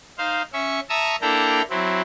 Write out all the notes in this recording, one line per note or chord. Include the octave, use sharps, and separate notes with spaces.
D#4 C5 F5
C#4 E5 C#6
E5 A5 A#5 C#6 D#6 E6
A#3 D4 E4 A4 G5 A#5
F#3 C4 E4